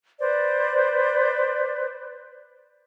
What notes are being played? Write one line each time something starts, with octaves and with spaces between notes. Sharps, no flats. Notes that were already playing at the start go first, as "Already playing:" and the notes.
B4 C5 D5